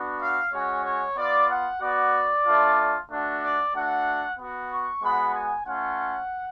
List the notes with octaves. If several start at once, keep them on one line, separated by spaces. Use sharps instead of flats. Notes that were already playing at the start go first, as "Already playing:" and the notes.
Already playing: B3 D4 F#4
F5
G#3 C#4 F#4 C#5
C#5
B3 F4 D5
F#5
B3 F#4 D5
A3 D4 F4
A3 D4 F#4
D5
A3 D4 F#4 F#5
B3 F#4
C#6
G#3 B3 F#4 B5
G#5
A3 C#4 F4 F#5